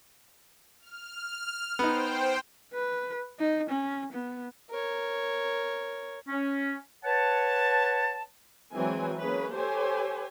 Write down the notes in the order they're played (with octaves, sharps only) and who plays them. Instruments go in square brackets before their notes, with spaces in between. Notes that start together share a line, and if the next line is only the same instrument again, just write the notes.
[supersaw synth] F6
[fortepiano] B3 D#4 [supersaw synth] C5 G5
[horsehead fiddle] B4
D#4
C#4
B3
[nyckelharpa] A#4 C#5
[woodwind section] C#4
B4 C#5 F#5 A5
[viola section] E3 F#3 G#3 C4 G#5
A#3 C#4 G#4 B4 C#5
G4 A4 C5 C#5 G#5